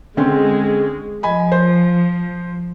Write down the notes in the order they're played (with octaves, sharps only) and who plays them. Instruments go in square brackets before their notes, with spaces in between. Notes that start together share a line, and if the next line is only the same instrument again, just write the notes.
[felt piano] D3 C4 C#4 [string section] G#3
[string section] F3 [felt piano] D#5 G#5 B5
[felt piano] C5